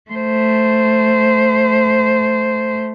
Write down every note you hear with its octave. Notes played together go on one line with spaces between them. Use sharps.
A3 C5